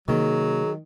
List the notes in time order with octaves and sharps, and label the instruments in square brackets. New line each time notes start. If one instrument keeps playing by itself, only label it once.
[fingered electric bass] C3 A#3 [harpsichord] D#3 [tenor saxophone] F#3 [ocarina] G#4